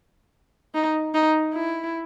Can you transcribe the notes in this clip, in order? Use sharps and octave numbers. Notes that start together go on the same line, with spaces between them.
D#4
D#4
E4